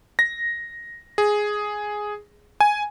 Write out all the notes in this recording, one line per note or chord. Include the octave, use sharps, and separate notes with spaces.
A#6
G#4
G#5